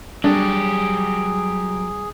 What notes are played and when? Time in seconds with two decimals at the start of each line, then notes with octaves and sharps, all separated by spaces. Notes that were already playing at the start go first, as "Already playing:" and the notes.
0.24 F#3 G3 D4 G4 G#4